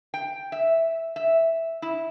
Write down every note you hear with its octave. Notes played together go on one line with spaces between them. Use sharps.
G5
E5
E5
E4